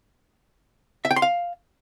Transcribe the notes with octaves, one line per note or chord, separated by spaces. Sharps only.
E5
G5
C6
F5